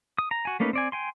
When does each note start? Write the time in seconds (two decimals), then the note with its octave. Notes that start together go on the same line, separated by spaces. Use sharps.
0.18 D#6
0.31 A#5
0.45 F#4 G#5
0.60 A3 A#3 C#4 D#4 B4
0.73 C4 D5 G#5
0.92 G5 G#5 C6